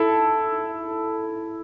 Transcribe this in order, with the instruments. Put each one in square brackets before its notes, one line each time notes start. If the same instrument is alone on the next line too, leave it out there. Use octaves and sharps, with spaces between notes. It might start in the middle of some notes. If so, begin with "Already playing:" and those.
Already playing: [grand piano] E4 A4